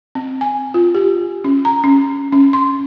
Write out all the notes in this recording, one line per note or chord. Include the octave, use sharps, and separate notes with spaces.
C4
G#5
F4
G4
C#4
A#5
C#4
C#4
C6